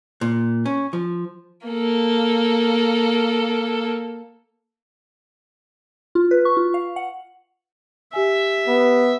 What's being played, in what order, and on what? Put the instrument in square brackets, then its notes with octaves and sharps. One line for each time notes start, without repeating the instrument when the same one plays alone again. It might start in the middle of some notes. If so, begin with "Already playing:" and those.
[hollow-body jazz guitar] A#2
C#4
F3
[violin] A#3 A4
[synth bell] F4
B4
C#6
F4
F5
F#5
[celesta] G4 G#5 [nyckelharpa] E5
[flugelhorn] B3